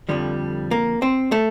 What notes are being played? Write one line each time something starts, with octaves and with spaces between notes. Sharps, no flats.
F2 D3 F3 G3
A#3
C4
A3